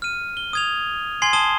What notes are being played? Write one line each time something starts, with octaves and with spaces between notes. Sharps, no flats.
F6 D#7
G7
D#6 G#6 F7
G#5 C6 G#6 C7 G7
A5 D#6 G7